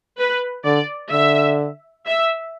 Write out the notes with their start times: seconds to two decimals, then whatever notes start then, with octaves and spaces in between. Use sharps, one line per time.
0.19 B4
0.65 D3 D5
1.12 D3 E5
2.06 E5